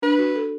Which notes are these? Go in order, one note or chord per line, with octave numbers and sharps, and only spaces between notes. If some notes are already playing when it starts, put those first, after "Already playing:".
D4 B4
F#4
A4